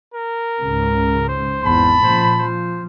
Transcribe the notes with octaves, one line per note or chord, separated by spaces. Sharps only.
A#4
C#2 G#2 C#3
C5
G#1 E2 A5 B5
A#2 C#3 F3 C5
F3 C5